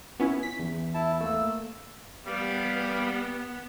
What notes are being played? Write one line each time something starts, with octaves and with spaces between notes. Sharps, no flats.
B3 C#4 E4
B6
E2
E4 A5
A3 A#3 E6
G3 B3 G4 F5